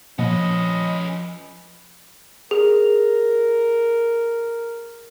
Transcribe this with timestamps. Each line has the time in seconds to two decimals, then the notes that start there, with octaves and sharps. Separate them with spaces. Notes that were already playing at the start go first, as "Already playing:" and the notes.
0.19 A#2 F3 C#4 B4 D#5
2.51 G#4 A#4